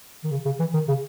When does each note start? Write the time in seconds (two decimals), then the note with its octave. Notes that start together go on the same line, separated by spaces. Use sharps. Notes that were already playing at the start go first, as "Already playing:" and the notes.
0.24 D#3
0.31 C#3
0.45 C#3
0.60 E3
0.74 D#3
0.88 C#3